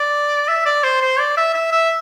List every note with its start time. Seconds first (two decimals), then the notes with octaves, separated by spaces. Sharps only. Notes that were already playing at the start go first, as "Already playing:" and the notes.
Already playing: D5
0.48 E5
0.65 D5
0.84 C5
1.01 C5
1.19 D5
1.37 E5
1.54 E5
1.72 E5